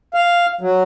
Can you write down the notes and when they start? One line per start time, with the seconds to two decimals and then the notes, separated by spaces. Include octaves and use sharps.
0.14 F5
0.61 F#3